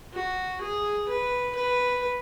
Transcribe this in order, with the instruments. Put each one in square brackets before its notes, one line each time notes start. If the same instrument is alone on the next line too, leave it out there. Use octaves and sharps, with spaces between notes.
[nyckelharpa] F#4
G#4
B4
B4